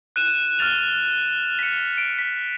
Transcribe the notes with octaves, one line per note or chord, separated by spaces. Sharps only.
F#6 D#7 E7
F6 F#6 A6 F7
B6 C#7
D7
B6